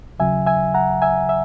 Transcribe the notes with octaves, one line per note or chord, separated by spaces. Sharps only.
D#2 C#3 F#3 E5 G#5
E5 G#5
F#5 A#5
E5 G#5
E5